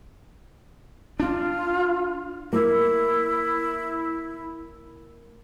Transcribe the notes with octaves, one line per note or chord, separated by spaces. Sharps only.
D4 F4
A#3 E4